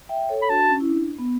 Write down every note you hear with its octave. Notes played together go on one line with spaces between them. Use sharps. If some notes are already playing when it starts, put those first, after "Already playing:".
E5 G5
A4 C#5
B5
D4 F#4 A5
C#4
E4
D4
B3